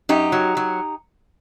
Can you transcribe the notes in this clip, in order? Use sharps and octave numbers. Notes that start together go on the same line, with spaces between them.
F#2 D#4 G4
F#3
F#3